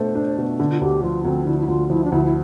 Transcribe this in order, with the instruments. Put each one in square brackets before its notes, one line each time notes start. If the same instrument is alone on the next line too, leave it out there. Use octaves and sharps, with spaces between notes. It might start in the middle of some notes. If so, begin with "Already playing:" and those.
Already playing: [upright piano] B2 A3 D4 A4 [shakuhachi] C5
[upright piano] D4
B2
D3
[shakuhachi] F4
[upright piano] D2 [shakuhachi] G4
[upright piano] F3 [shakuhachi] F4
[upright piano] D2 [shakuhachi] C4
[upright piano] D3 [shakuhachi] E4
[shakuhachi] E4
[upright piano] D2 [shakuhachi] F4
[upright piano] F3 [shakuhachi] E4
[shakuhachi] D4
[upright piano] D2 [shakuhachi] E4
[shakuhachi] E4